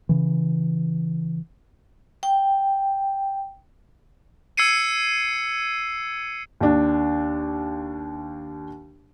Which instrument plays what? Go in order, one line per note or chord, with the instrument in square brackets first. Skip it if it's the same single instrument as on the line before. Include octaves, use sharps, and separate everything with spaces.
[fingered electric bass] C#3 E3
[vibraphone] G5
[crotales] E6 G#6 C7 C#7 D#7
[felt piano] D#2 D4